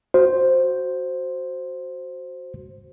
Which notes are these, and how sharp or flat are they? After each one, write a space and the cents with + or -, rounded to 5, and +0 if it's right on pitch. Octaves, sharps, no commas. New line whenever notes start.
F#4 +0 C5 +0